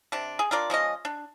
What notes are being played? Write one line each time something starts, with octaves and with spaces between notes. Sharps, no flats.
C3 D4
G#4
D4 F4 A#4 D5
F3 G#3 C#4 D#5
D4